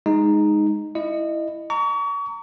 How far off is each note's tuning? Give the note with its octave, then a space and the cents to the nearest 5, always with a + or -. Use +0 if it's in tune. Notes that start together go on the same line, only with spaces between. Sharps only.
G#3 +0 D#4 +0
E4 +5 D#5 -25
A#5 -20 C#6 +35